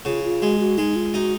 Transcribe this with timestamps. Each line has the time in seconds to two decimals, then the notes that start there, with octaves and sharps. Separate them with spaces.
0.05 C#3 F4
0.24 F4
0.42 G#3 F#4
0.60 F#4
0.78 G#3 D#4
0.96 F4
1.14 D#4 F#4